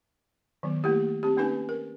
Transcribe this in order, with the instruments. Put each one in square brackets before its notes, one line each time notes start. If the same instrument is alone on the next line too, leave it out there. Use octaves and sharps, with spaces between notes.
[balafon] D#3 F#3 B3
A3 A#3 E4 G4
C4 G4
A#3 C#4 D#4 B4 G#5
A#4